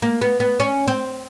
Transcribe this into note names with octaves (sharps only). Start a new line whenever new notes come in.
A#3
B3
B3
C#4
C4